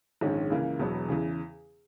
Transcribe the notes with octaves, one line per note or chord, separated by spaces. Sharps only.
A#1 G#2 D#3 G#3 C#4
C#2 C#3 E3 A#3
E1 E2 B2 F#3 B3
E2 C#3 E3